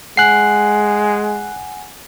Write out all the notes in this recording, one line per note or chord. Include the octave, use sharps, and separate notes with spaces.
G#3 F#5 G#5 F#6 C7